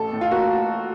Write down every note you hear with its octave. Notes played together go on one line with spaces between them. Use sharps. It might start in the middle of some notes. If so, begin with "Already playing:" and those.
Already playing: A1 A3 A4
A2
F4
A#3 F#4